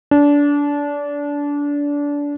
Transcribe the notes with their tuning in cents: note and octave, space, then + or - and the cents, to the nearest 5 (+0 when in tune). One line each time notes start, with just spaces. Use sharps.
D4 -25